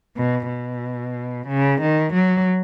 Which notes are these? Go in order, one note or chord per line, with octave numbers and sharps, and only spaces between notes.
B2
B2
C#3
D#3
F#3